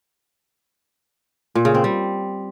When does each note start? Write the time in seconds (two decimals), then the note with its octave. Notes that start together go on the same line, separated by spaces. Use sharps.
1.55 A#2
1.65 C#3
1.74 C4
1.84 G3